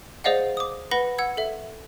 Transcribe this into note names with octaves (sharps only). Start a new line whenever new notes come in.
G#4 C5 D5 D#5 F5 F#5
D6 D#6
B4 F#5 B5 A#6 G7
F#5 E6 G#6
A4 E5